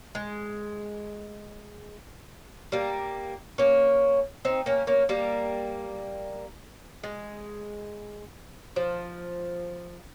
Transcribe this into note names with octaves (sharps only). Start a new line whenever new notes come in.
G#3
G3 A#3
A#3 C#4
C4 D#4
A#3 C#4
A#3 C#4
G3 A#3
G#3
F3